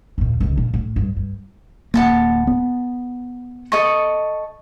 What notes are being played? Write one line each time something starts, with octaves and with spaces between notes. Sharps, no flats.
D#2 A#2
C#2 D3
A#2
A2
G2
G2
D1 A#3 F#5 A5 B5
B3
A4 D#5 C#6